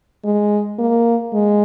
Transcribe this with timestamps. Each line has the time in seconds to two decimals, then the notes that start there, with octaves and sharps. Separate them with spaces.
0.24 G#3
0.79 A#3
1.33 G#3